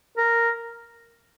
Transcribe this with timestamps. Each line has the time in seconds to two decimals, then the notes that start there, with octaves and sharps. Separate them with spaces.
0.17 A#4